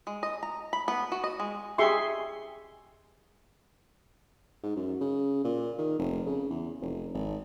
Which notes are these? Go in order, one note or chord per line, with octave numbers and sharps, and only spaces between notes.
G#3
D#5
A#5
B5
B3
F#4
D#5
G#3
G4 G#4 E5 C6 C#6
G#2
F#2
C#3
A#2
D#3
F1
C#3
E2
F1
G#1